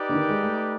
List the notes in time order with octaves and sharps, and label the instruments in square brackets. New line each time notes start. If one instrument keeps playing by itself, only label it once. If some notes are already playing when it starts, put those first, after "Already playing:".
Already playing: [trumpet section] D#4 G4 B4 D5
[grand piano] D3
D#3
G#3
A3